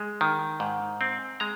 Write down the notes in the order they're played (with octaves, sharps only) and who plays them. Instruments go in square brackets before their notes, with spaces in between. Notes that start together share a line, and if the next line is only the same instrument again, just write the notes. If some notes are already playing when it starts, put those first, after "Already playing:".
Already playing: [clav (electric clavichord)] G#3
D#3
G#2
C4
G#3 A#5